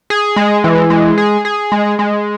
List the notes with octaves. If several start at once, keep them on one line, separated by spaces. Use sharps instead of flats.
G#4
G#3
E3
G#3
G#4
G#4
G#3
G#3